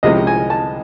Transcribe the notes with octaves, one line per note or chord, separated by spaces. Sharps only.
C2 C3 F3 G#3 C#4 D#5
G#5
A5